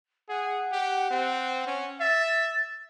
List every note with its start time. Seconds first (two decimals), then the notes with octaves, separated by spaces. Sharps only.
0.29 G#4 F#5
0.72 G4
1.11 C4
1.67 C#4
2.00 E5 A6